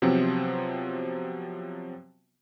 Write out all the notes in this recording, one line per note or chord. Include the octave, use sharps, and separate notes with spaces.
C3 F3 F#3 B3 C4